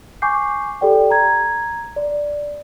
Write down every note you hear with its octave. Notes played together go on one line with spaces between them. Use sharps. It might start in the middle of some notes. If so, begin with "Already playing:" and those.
G#5 C#6 D6 G6 C7
G4 A4 D5 G5
A#5 G#6
D5